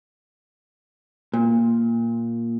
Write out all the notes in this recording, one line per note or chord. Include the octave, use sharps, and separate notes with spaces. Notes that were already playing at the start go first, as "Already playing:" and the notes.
A#2